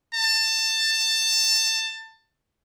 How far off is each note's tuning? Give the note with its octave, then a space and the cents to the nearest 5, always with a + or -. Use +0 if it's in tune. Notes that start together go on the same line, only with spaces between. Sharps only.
A5 +20